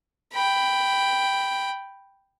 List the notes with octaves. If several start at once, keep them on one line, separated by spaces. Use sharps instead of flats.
G5 B5